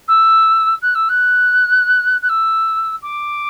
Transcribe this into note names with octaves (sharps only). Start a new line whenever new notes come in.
E6
F#6
E6
F#6
F#6
E6
D6